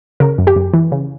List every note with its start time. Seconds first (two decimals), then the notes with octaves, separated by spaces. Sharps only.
0.20 C#3 A#4
0.38 F#2
0.47 G4
0.56 F#2
0.74 E3
0.92 C#3